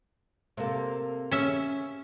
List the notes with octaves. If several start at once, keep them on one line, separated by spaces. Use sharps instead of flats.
C3 A#3 A4
C#4 G#4 E5